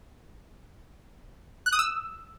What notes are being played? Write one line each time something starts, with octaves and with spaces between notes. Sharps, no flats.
F#6
D#6
E6